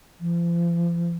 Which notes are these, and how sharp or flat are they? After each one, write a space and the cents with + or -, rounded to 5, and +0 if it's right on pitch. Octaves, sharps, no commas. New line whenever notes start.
F3 -40